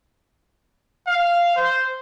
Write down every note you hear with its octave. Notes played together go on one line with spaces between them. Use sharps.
F5
C5